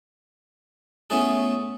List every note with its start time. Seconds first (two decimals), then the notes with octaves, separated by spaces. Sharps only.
1.10 A3 B3 C#4 E4 G#4 A4